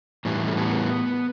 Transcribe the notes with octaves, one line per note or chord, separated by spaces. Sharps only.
A2 E3 G3
A3
B3